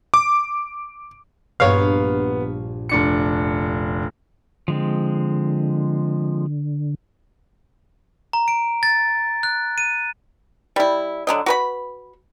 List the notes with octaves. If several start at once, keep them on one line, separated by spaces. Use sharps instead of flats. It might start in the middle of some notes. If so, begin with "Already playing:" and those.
D6
A#1 G2 A#3 B3 C#5 F5
F1 D4 C#7
D3 F3 G#3 C4
A#5
D7
A6
F#6
D#7
G3 E4
D3 F#3 D#5
F#4 B4 B5